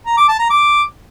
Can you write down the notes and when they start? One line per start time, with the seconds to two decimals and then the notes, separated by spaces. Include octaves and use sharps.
0.06 A#5
0.17 D6
0.28 A5
0.39 A#5
0.50 D6